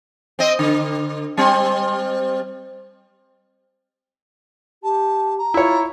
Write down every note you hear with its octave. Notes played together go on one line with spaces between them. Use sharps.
C4 D#5
D3
G3 C4
G4 A5
A#5
E4 F4 C#5